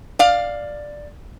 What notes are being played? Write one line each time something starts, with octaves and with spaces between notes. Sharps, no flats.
D5 F5